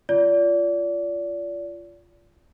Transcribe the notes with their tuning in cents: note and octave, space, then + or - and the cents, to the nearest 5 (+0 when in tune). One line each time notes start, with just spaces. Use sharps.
F4 -20 D5 -30